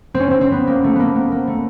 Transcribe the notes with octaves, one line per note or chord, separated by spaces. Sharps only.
C4
C#4
C4
C4
B3
A#3
A3
A#3 B3
B3
A#3
A3